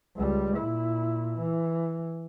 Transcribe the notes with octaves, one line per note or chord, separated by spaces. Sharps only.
C#2 G3
A#2 E4
E3